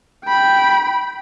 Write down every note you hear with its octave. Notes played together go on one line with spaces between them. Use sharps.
G5 B5